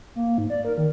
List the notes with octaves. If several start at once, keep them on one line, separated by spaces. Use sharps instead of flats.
A#3
G#2
D5
A#4
D#3